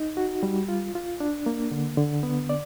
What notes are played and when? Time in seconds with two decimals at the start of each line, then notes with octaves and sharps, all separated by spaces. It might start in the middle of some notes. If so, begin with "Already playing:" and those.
Already playing: D#4
0.17 F#4
0.43 G3
0.69 F4
0.95 F4
1.20 D4
1.46 A#3
1.71 D3
1.97 D3
2.23 B3
2.49 D5